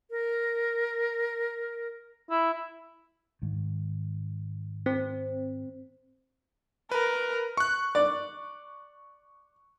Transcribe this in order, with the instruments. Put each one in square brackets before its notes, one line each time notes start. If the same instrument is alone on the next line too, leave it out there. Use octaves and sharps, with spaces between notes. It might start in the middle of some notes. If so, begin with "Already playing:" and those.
[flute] A#4
[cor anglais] E4
[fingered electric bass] G#2 D#3
[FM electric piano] C4
[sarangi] A#4 [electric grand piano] B4
[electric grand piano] C#6 F#6
[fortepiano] D5